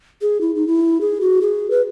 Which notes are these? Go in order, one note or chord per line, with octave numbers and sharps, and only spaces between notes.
G#4
E4
D#4
E4
G#4
F#4
G#4
B4